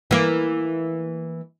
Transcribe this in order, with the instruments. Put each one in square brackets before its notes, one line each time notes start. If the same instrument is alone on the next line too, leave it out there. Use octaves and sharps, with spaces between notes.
[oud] E3 A#3